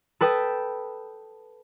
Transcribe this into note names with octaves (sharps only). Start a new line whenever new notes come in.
A4 B4 G5 D#6